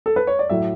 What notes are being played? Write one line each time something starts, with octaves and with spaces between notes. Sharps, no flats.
A4
B4
C#5
D5
A2 F#3 A3 E5